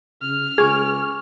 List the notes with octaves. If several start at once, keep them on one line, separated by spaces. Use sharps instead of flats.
C#3 F6
C#2 G#4 G#5 C#6 D6